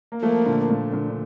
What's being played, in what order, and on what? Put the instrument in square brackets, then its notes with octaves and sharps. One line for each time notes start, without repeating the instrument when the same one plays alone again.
[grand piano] A#3
[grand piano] F3 A3 [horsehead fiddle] A#3
[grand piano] A#2 D3
A#2
A#2 D3
D3